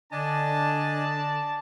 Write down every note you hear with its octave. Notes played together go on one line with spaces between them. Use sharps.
D3 D4 D5 D#5 G#5 A5